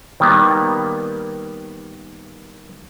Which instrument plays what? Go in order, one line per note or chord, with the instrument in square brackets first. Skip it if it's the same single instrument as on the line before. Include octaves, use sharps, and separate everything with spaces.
[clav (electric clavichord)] D#3 G3 A#3 B3